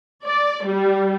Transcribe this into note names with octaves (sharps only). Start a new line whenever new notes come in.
D5
G3